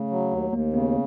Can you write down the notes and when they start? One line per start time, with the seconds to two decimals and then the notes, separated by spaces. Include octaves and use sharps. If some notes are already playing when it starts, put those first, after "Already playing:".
Already playing: C#3 A3
0.10 F#3
0.31 D#2
0.52 D#2 A#3
0.74 C#3 B3